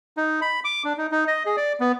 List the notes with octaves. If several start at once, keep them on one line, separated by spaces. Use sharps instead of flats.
D#4
B5
D6
D4
D#4
D#4
D#5
G#4
D5
B3